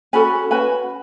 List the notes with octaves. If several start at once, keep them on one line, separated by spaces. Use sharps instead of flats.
C#4 F#4 A4 G#5 B5
C#4 F#4 B4 G#5 B5